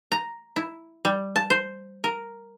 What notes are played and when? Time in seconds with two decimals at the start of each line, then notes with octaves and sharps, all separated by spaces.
0.12 A#5
0.56 E4
1.05 G3
1.36 A5
1.50 C5
2.04 A#4